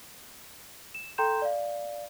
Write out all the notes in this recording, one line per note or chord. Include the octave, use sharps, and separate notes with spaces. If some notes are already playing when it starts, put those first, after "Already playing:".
E7
A4 G5 A#5 C6 G6 E7
D5 F5